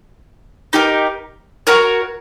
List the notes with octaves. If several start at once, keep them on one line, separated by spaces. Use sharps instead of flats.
D#4 G4 A#4
F#4 A#4 C#5